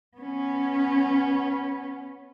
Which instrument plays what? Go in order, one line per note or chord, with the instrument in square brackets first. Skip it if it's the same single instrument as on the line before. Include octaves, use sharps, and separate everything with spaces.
[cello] B3 C#4